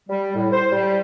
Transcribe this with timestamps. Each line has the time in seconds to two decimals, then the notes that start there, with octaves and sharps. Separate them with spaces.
0.09 G3
0.35 A2
0.52 C5
0.72 G3